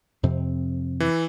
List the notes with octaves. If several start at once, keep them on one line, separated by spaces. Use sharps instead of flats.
F2 C3 C4
E3